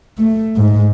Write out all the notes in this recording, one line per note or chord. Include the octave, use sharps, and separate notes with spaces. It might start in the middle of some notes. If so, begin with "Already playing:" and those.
A3
G#2